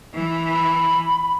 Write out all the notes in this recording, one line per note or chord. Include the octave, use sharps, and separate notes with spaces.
E3
B5